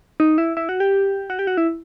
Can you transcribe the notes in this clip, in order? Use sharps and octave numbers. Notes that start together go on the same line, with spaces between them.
D#4
E4
E4
F#4
G4
F#4
G4
F#4
E4